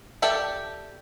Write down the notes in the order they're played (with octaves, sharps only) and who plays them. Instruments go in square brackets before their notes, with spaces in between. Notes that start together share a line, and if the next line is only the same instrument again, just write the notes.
[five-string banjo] G4 A4 D5 E5 G5